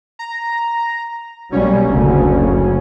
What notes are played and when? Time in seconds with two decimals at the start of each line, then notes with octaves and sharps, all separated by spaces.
0.19 A#5
1.52 B1 G3 A#3 C#4
1.87 F#1 D2 C#3